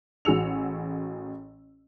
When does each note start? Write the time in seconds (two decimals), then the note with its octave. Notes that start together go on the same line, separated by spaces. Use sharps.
0.25 A1 F#4 G#4 E6 C#7 F7